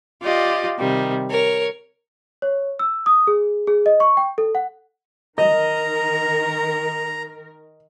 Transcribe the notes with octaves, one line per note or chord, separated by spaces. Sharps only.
F4 G4 D5 D#5
C3 D#3 G3
A#4 C#5
C#5
E6
D#6
G#4
G#4
D#5
C#6
G5
A4
F#5
D#3 A#4 D#5 A#5